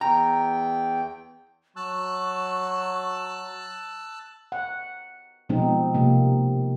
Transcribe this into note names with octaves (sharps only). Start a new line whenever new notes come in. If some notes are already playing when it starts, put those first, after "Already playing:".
E2 G5 A#5
F#3 A5 C#6 E6 F#6
F#5
B2 F3 G#3 C4 D#4
C3 A#3